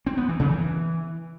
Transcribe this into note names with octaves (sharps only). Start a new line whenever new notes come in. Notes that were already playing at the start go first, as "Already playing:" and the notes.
C4
B3
E3
C#3
E3